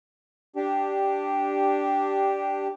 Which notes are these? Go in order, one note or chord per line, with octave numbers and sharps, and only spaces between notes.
D4 G4